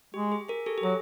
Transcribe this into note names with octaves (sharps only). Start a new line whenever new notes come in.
G#3 G4
G#4
G#4 A#4
G4 A4
G4
F#3 G#4